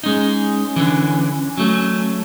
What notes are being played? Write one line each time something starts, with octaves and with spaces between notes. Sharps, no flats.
G#3 C#4 D#4
D3 E3
F#3 A3